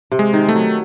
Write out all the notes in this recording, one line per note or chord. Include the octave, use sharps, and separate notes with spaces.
C3
G#3
D#3
A3
F#3